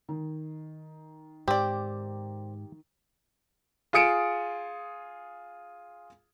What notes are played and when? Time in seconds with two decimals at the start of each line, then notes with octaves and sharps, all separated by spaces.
0.09 D#3
1.48 G#2 C4 G4 D5
3.93 F4 G#4 D#6 C#7 D7 E7